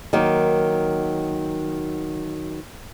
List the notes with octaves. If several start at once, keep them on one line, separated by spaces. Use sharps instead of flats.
D#3 F#3 A#3